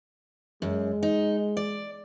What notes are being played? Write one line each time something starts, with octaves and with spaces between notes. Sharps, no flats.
F#2 G#3
D#4
D5